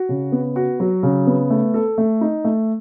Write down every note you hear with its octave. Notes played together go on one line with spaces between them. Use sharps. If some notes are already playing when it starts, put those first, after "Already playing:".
Already playing: F#4
C#3
B3
F#4
F#3
C#3
B3
A3
A4
A3
D#4
A3